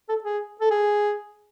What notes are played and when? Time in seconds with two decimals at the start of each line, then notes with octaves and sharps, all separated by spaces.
0.09 A4
0.24 G#4
0.61 A4
0.71 G#4